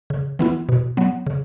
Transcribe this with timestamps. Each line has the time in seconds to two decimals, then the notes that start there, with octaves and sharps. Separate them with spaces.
0.10 C#3
0.39 E3 B3 E4
0.69 B2
0.97 F#3 B3
1.27 C#3